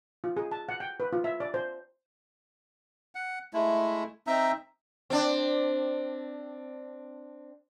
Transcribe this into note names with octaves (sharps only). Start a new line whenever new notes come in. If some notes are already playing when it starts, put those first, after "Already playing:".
F4
G#4
A5
F#5
G5
B4
F4
E5
D5
C5
F#5
G#3 A3 E4
C4 D#4 E5 A#5
C4 D4